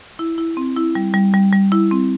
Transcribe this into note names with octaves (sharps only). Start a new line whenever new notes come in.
E4
E4
C4
E4
G3
G3
G3
G3
E4
C4